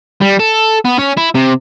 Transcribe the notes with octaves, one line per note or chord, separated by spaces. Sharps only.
G3
A4
B3
C#4
E4
C3